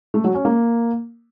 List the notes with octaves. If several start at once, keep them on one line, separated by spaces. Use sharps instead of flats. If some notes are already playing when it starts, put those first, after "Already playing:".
A3
F#3
C#4
A#3